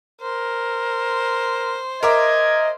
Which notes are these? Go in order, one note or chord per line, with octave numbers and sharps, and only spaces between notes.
A#4 C5
A#4 D#5 E5 D6 G#6